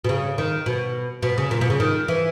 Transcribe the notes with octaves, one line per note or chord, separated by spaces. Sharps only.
B2
C#3
D#3
B2
B2
C#3
A#2
B2
C#3
D#3
E3